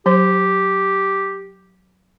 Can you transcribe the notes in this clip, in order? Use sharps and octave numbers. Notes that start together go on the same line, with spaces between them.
F#3 G4 C5